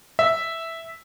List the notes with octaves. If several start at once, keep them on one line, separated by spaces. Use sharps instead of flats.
E5